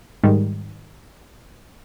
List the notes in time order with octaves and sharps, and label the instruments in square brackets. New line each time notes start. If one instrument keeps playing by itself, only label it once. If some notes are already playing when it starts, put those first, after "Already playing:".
[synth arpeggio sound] G#2 D#3 G3